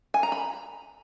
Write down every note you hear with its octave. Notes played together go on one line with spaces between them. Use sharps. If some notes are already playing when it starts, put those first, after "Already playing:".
G#5
A#5
B5